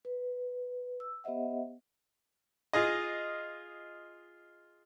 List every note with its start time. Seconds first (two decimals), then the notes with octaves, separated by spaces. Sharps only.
0.05 B4
1.00 E6
1.24 B3 G4 C5 D#5 E5 F#5
2.73 F4 G#4 D#5